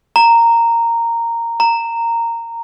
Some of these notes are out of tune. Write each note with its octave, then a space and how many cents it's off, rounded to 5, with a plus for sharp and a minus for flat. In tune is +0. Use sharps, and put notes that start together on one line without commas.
A#5 -10
A#5 -15